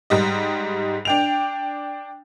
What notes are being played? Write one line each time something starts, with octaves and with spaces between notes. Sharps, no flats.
G#2 G3 D#5
D4 G5 F7